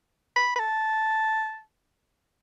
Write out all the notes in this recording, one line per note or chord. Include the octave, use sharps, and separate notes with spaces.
B5
B5
A5